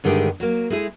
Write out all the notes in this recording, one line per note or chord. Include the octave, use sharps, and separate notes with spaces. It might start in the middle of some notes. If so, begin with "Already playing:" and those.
G2 D3 D#3 G#3 A3 G4
F#3 A#3
G#3 A3 E4 G#4